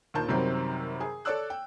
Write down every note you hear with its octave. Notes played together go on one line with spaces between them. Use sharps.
A#1 D#2 A#4 A5 G6
F#2 C3 D#3 F#3 G3 C4
G#4
A4 C#5 D5 D6 E6 F#6
G5